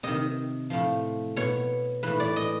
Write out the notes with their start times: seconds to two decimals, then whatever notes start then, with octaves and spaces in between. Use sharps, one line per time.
0.03 C3 D#3 D#5
0.70 A2 F3
1.36 B2 C#5
2.03 A2 E3 B4
2.20 D5
2.36 D#5